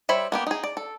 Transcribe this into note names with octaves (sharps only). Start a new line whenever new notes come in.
G3 C5 C#5 E5 B5
A#3 B3 G4
D#4 G#4
D5
A4